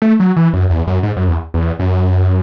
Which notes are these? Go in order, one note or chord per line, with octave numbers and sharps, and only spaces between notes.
A3
F#3
E3
F#2
E2
F#2
G#2
F#2
E2
E2
F#2